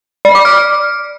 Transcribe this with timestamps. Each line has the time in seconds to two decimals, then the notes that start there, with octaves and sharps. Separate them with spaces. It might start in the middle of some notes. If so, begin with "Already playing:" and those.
0.25 D5
0.35 D6
0.45 F6